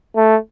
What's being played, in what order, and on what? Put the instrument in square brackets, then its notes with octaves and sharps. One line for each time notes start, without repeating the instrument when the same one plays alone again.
[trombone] A3